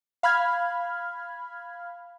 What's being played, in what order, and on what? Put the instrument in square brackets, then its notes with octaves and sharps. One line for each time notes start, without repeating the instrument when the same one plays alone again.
[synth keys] F5 B5 F6 G#6